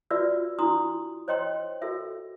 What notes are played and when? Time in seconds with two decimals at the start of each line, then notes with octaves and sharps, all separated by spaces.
0.11 F4 F#4 B4 D5 E5 E6
0.59 D4 E4 F#4 C6 D#6
1.28 C5 C#5 D#5 G5 C6
1.82 F#4 A4 A#4 E5